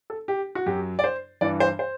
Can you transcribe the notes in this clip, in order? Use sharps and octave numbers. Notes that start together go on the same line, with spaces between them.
A4
G4
F#4
F#2 F#3 G4
D5
C5
G2 E3 D5
C5
C5